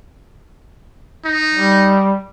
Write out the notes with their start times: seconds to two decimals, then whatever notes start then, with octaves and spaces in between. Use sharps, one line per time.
1.25 D#4
1.54 G3